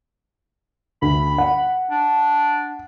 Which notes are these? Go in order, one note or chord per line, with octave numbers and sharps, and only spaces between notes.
D2 B5
F#5
D4